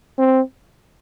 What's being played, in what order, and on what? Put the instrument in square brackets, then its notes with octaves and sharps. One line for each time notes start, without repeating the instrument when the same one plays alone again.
[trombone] C4